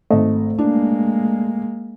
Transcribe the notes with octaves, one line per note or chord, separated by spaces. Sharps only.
G#1 A3 D#5
G#3 A#3 D4